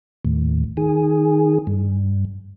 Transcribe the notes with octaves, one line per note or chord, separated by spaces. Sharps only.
D#2 A2
D#3 G#4
G2